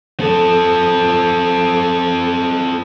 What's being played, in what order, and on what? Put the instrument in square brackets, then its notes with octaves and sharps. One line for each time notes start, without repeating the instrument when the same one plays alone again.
[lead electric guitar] C4 A4